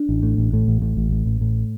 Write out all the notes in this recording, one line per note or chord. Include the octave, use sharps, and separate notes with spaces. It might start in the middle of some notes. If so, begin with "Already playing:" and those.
Already playing: D4
A1
A2
A1
A2
A1
A2
A1
A2
A1
A2